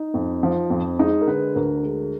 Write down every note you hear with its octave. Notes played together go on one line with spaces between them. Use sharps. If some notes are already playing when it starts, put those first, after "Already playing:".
Already playing: D#4
F2
F3
F2
G#3 D#4
A#4
D3 B4
D2 A#4
G#3